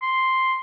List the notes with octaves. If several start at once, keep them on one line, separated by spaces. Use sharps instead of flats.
C6